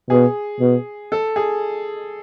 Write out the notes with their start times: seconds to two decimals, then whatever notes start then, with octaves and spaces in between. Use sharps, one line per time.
0.10 B2 G#4
0.60 B2
1.12 A4
1.36 G#4